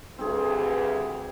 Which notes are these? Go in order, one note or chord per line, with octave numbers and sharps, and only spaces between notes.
D2 G2 C4 G#4